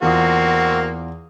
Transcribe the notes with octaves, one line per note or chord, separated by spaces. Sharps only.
E2 A#3 C4 F4 F#4 D#6